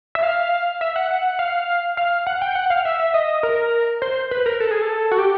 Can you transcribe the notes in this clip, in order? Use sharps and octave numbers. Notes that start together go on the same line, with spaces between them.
E5
F5
E5
F#5
F#5
F5
F5
F#5
G5
F#5
F5
E5
E5
D#5
A#4
C5
B4
A#4
A4
G#4
A4
F#4
G4